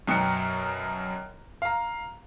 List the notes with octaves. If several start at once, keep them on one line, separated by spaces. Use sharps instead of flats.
F#2 B2 G5 A#5 C#7
F5 A#5